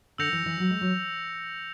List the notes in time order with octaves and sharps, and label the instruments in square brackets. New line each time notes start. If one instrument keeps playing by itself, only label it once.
[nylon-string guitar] D3 [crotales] E6 G6 A#6 C#7 F7
[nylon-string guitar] E3
E3
F#3
G#3
F#3